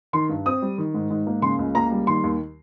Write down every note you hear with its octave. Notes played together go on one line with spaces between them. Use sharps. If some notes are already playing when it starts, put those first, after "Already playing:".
D#3 C6
G2
C4 D#6
G3
D#3
G#2
G#2
A#3
C#3 C6
C#2
A#3 A#5
G3
D#3 C6
D#2